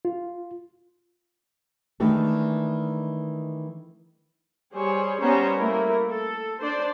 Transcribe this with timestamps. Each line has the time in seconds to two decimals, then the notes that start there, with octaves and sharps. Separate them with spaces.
0.05 F4
2.00 D#3 E3 G#3 A3 D4
4.74 G3 G#4 C5 C#5
5.21 G3 B3 C#4 C5 C#5 A#5
5.59 A3 A#3 E4 A#4
6.10 A4
6.61 D4 C5 D5